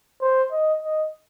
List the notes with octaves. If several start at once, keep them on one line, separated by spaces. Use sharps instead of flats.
C5
D#5
D#5